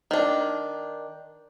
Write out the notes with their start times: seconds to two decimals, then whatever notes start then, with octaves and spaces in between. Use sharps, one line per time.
0.11 D#3 D4